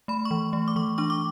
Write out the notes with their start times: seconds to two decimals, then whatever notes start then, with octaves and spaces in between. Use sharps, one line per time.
0.08 A3 B5
0.25 C#6
0.31 E3
0.53 A3
0.68 D6
0.76 E3 C#6
0.98 D4 C#6
1.10 D6